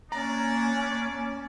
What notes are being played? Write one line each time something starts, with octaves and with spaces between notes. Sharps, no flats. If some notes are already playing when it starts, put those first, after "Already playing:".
A#3 C#4 D4 D5 A#5